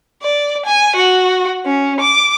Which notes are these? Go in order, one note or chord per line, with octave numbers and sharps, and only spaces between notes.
D5
G#5
F#4
C#4
D6